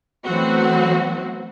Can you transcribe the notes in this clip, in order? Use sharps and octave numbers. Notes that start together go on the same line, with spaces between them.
E3 F#3 A3 B3 C4 F#4